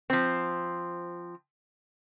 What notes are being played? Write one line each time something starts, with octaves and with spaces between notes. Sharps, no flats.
F3 C4